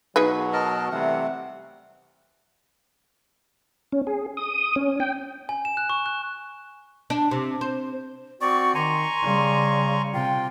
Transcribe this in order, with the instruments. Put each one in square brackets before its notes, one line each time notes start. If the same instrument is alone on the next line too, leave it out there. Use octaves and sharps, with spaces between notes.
[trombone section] B2 F#3 [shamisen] D#4 G#4 B4
[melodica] A#4 D#5 A5
[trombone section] C3 E3 G3 [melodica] A3 F#5
[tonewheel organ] C#4
G#4
D#6
C#4
G5
[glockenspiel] G#5
E7
F#6
C#6
F#6
[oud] D4
C3
C5
[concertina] C4 D5 [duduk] F#4 [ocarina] C#6
[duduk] D#3 [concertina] G#5 A#5 C#6 [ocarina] C6
[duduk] C#3 [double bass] G3
[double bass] C3 [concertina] F4 [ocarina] G5